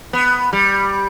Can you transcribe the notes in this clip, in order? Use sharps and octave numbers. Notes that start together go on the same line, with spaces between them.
B3
G3